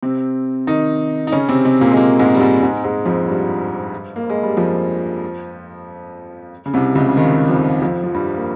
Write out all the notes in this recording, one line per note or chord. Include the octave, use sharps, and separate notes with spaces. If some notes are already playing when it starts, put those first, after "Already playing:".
C3 C4
D#3 D#4
D#4
C#3 C#4
C3 C4
C3 C4
A#2 A#3
G#3
A#2 A#3
G#2 G#3
G3
G#2 G#3
G#2 G#3
G#2 G#3
F2 F3
G2 G3
A#3
G#3
G3
F2 F3
C#3
C2 C3
C#2 C#3
C#3
D#2 D#3
F2 F3
F2 F3
F3
G2 G3
A#3